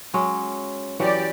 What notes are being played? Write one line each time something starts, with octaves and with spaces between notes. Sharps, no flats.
F#3 G#3 C#4
E3 F#3 G4 D5 F#5